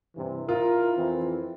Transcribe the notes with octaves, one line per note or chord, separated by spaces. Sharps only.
G2 C3 E3
E4 F4 A#4
F2 E3 C4